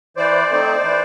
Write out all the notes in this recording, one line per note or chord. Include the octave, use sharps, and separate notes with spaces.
E3 C5 D5
A3 C4 D#4
E3